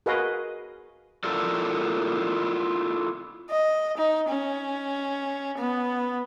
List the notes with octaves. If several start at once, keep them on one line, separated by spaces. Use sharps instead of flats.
F#4 G#4 A#4 B4 D#5 F5
E4 F4 A4 A#4 D5
D#5
D#4
C#4
B3